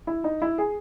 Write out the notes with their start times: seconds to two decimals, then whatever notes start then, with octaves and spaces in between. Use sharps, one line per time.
0.07 E4
0.24 D#4
0.42 E4
0.58 G#4